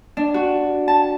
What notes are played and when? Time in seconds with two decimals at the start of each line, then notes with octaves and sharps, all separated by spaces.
0.17 D4
0.34 F#4
0.88 A5